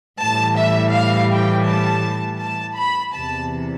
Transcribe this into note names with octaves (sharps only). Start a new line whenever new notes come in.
A2 E3 G3 A5
E5
F5
G5
A5
A5
B5
E2 C3 E3 A5